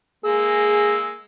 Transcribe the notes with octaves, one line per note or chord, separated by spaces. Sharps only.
G#3 A#3 G#4 E6